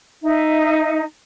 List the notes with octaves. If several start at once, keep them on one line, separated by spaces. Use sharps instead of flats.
D#4 E5